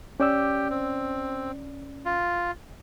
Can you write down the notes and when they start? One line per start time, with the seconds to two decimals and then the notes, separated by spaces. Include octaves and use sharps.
0.20 C#4 G4 D5 E6
0.70 C4
2.05 F4